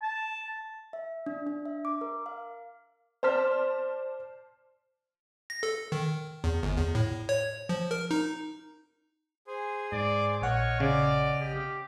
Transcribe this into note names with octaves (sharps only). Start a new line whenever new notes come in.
A5
E5
D4
D4
E5
D6
A#4
F5
C5 D5 A5 F6 B6
A#6
A4
D#3
E2
G1
E2
A2
C#5
F3
A#4
D#4
G#4 C5 G#5
G#2 D5
A#1 C#5 D#5 F#5 F6
C#3 D5
G4